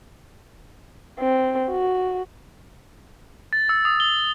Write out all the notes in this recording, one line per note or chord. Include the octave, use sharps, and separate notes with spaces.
C4
F#4
A6
E6
D#6
G7